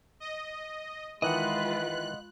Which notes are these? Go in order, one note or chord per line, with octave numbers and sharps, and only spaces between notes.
D#5
D#3 E3 G#3 F4 B4 D#5 F#5 F#6